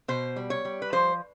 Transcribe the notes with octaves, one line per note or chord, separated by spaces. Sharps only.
B2 C5
G3
C#5
G3
B4
F3 C5